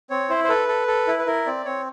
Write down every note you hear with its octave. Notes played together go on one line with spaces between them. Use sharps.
C4 C#5
E4 C5
C5
A4 B4
A4
A4
E4
B4
E4 A#4
C4 D5
C4 C#5